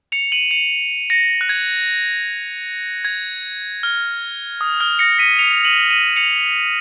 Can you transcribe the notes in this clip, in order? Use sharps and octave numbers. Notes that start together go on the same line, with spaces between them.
C#7 F7
D#7 F#7
C#7 F7
A#6 C#7
F#6
G#6
G#6
F6
D#6
F6
A#6 C#7
B6 D#7
C#7 F7
D#7 F#7
D#7 F#7
C#7 F7